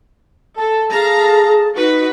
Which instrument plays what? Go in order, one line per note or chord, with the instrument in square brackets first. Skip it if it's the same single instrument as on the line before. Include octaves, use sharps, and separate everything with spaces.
[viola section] A4 [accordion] A5
[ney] G#4 [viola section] A4 F5 A#5
[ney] D#4 [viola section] F#4 B4